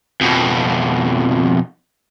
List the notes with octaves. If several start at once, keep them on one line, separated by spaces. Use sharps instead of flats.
F2 B2